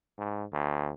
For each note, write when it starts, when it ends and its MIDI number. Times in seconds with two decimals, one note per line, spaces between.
0.18 0.44 44
0.52 0.93 38